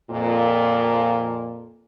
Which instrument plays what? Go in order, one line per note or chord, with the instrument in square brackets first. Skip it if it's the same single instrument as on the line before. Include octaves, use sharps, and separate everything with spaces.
[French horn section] F2 A#2